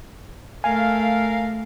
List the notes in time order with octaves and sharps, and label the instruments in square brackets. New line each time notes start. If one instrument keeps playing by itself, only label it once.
[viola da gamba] A3 [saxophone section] A#4 F5 [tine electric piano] G#5